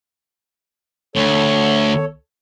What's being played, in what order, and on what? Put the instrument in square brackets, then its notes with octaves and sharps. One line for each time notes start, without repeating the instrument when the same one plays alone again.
[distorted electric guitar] D2 [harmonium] A4 C#5